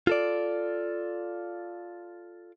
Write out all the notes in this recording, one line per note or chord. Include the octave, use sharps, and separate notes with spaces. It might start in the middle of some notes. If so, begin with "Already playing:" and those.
F4 A4 D5